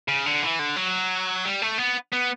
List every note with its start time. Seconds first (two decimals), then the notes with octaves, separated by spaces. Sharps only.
0.08 C#3
0.26 D3
0.43 E3
0.59 D3
0.76 F#3
1.45 G3
1.62 A3
1.78 B3
2.13 B3